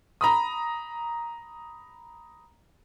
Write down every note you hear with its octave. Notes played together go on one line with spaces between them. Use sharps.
A#5 B5 D#6